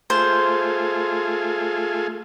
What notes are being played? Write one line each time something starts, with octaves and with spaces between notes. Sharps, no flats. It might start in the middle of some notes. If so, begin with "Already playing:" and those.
A3 F4 G#4 C5